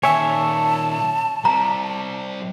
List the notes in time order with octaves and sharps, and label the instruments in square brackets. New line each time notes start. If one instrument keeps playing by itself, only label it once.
[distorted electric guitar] A#2 D#3 [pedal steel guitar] C#5 E5 [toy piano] G#5 [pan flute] A5
[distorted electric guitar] G3 C4 [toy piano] A#5